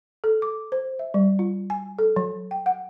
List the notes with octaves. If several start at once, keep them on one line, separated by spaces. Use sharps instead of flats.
A4
D6
C5
E5
G3
F4
G#5
A4
F#3
G5
F#5